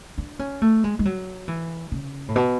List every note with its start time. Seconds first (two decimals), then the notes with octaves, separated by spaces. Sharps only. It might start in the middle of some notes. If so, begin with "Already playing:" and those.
0.18 D4
0.39 C#4
0.62 A3
0.84 G#3
0.99 G#3
1.05 F#3
1.48 E3
1.92 C#3
2.28 A2
2.36 B2